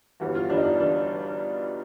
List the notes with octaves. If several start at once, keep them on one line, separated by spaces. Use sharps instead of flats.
G1 G2 E3 G3 F#4
F4
G1 G2 E3 G3 D4
D#4
D4
E3 G3 D4